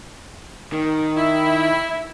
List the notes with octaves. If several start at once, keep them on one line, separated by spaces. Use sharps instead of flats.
D#3
E4